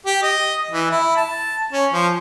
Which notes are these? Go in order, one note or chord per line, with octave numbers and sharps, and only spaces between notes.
G4
D#5
E3
E4
A5
C#4
F3